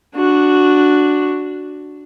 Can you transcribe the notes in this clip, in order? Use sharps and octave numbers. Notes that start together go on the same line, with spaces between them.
D4 F#4